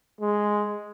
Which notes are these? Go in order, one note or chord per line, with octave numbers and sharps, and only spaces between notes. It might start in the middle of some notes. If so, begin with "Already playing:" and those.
G#3